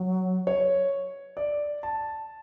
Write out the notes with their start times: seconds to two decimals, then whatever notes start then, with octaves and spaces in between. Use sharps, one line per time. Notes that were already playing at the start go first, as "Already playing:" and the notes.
Already playing: F#3
0.47 C#5
1.37 D5
1.83 A5